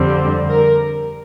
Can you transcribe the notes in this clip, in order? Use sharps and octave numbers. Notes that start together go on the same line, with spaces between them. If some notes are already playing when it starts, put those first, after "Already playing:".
Already playing: F2 D3 G3 C4
A#4